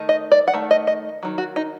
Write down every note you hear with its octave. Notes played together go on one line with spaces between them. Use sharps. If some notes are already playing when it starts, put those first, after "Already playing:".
Already playing: D#3 A3 D#4
D#5
D5
F#5
D#3 A3
D#5
D#5
D#3 F#3
F#4
D#4